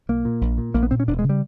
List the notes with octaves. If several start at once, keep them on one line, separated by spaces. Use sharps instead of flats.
B1 A#3
A#2
A#1
A#2
A#1 A#3
B3
A#2 C4
C#4
E1 D4
G#3
C#3
G3